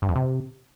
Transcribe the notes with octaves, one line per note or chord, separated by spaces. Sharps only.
G2
F2
C3